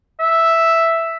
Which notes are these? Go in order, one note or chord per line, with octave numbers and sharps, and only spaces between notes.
E5